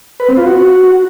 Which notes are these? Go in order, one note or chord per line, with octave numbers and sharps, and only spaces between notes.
B4
C4
F4
F#4